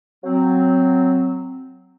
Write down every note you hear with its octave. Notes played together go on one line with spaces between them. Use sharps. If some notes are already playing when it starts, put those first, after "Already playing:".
F#3 C4